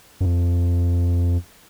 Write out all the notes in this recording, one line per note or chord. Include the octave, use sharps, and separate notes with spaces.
F#2
F2